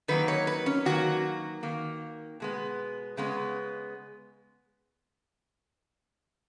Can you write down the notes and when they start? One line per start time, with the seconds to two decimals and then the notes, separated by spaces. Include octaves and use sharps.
0.08 D#3 F#3 A#3 B4
0.28 C#5
0.47 B4
0.66 C#4
0.85 D#3 F#3 A#3 F#4
1.63 D#3 A#3
2.40 B2 G#3 B3
3.17 C#3 G#3 B3